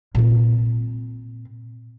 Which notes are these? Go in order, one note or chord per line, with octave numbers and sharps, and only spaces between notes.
A#2 C4